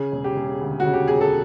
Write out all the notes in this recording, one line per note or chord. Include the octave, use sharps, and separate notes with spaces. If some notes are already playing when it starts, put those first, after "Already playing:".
Already playing: C#3 G#4
E1
G4
E1
D2
F#4
C#3
G4
E1 G#4
A4